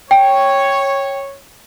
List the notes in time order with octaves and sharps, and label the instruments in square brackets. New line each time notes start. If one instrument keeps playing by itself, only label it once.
[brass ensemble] C#5 [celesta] G5